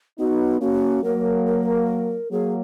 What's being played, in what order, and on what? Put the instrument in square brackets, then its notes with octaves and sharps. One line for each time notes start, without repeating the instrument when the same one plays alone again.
[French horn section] B3 D#4 [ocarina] F#4
[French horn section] A#3 C#4 [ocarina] F#4
[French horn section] F#3 A#3 [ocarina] A#4
[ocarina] A#4
[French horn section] F#3 A#3 [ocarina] G#4